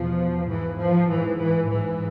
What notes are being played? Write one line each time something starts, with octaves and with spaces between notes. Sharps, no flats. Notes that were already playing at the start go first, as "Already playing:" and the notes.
Already playing: E2 B2 F3
G#2 E3
F3
G#2 E3
E3
G#2 E3